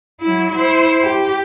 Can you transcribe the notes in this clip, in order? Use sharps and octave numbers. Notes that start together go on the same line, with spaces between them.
F#3 E4
E4 C5
G4